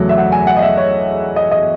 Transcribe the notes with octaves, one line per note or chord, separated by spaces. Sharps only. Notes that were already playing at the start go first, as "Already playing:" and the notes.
Already playing: E2 C#3 F#3 A3
E5
F#5
G#5
F#5
D#5
E5
C#5
D#5
D#5